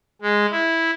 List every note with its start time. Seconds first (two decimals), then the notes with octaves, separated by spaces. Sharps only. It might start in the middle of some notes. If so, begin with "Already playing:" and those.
0.21 G#3
0.51 E4